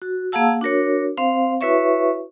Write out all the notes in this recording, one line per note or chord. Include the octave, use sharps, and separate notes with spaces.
F#4
A#3 G#4 F5 F#5 A5 E6
D4 F#4 A#4 C#5
C4 C5 F5
E4 F#4 B4 C#5 E5 C#6